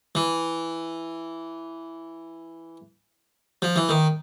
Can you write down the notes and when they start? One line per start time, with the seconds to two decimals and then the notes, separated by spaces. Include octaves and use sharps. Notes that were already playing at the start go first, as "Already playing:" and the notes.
0.15 E3
3.62 F3
3.76 E3
3.89 D#3